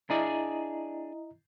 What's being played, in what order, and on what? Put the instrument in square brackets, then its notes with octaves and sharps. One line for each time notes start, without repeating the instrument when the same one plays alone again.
[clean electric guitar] D4 G#4 D5 [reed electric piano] E4 D#5 A#5